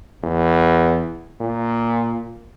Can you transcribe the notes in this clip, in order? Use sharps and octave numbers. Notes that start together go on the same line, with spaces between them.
E2
A#2